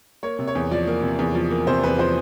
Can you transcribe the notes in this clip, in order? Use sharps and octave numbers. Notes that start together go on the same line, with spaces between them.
A#3 C#5
C3
C#5
E2
F3 D5
A#3
C3
E2
F3
A#3
C3 C5
E2 B4
F3 C5